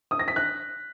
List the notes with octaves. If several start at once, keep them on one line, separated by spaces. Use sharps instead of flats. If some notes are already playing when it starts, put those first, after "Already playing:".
D#6
A#6
B6
F#6